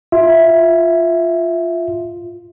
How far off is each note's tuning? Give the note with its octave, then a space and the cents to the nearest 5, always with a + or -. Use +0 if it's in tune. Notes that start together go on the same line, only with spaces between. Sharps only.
F4 +0 E5 -5